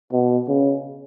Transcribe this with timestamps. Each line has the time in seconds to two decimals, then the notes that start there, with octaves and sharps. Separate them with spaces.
0.12 B2
0.48 C#3